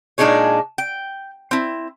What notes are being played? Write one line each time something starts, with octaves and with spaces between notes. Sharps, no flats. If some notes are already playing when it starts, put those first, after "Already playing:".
A#2 G#3 D4 D#4 G#4 C#5
G5
C4 E4